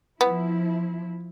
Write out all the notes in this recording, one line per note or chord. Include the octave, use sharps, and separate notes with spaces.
F3 B3 E4